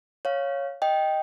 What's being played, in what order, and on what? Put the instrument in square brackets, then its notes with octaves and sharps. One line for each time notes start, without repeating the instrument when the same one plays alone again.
[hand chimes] C#5 F5
D#5 G5